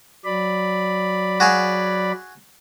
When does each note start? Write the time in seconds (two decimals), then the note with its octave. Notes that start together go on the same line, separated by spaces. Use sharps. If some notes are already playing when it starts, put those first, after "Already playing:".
0.25 F#3 D5 B5
1.40 F#4 G#4 F5